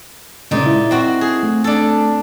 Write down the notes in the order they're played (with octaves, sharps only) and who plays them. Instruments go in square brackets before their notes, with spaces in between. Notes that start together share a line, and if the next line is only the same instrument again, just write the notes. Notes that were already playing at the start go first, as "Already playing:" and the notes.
[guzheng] A#2 D#4 [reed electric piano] C#3 G#3 C#4
[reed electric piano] E4
[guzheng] C4 F#4
G#4
[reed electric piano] A3
[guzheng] D4 A4